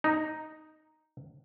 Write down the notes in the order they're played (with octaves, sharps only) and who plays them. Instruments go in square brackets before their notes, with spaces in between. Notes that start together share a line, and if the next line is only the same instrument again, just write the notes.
[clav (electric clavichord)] D#4